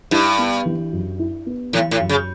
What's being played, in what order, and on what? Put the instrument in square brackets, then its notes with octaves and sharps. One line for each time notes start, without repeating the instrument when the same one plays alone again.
[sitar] G2 [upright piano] E4
[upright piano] B3
E3
F#2
E4
B3
[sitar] A2 [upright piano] E3
[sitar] A2
[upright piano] F#2
[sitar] C#3